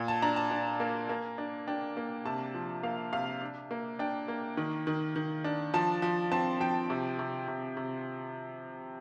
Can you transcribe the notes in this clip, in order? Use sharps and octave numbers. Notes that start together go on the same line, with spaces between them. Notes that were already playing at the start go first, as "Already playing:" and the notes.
Already playing: A#2
A5
D4 A#5
A5
D4
A#3
A#3
D4
D4 G5
A#3
C3 A5
F3
A#3 F5
C3 F5
D4
A#3
D4 G5
A#3
D#3
D#3
D#3
D4
F3 A5
F3
C4 A5
F3 G5
C3
C3
C3
C3